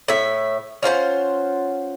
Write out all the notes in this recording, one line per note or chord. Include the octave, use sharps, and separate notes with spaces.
A2 E5
C#4 F4 C5 F#5